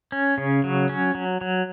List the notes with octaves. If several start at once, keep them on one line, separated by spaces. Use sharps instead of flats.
C#4
C#3
F#3
C#4
F#3
F#3